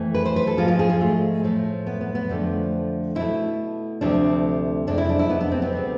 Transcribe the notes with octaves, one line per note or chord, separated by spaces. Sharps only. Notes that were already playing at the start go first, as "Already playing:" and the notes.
Already playing: F2 E3 A3
B4
C5
B4
A4
G#2 F3 G#3 F4
F4
G#4
F4
A3
A2 F3 A3
B3
B3
B3
F2 D3 F3 A3
B2 A3 E4
D2 C3 F3 A3 D4
F2 C3 G#3 D4
E4
D4
E4
B3
B3
C4
B3
D2 C3 G#3